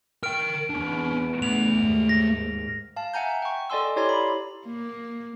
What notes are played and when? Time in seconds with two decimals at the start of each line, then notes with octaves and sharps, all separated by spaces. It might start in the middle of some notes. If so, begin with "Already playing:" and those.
0.23 A#4 G5 F6 D7
0.70 E2 B3 C#4 D4
1.42 A3 F#5 F7
1.78 D#2 G#2
2.09 A#6
2.96 F5 A5
3.14 E5 F#5 G#5 A#5 G6
3.42 G5 C#6
3.70 A4 D5 D#5 G#5 C6 E6
3.96 E4 G4 C#5 D5 A#5 C6
4.09 B5
4.66 A#3